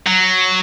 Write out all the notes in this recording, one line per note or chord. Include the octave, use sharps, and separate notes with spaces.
F#3